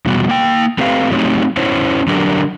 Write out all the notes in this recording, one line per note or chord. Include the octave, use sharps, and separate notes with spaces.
E2 B2 G3 B3 F#4
A#3 G5
A3 C4 G4 B4 F5
F#3 A3 C4 D#4 G4 C#5
C#4 E4 C5 C#5
D3 F#3 D4 G4 A#4